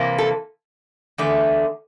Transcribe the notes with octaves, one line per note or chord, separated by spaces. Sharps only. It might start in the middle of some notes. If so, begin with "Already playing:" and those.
Already playing: C3 E3 A#3
A4
E2 D3 A3